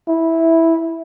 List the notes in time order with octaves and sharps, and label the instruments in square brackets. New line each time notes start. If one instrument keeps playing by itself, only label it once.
[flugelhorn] E4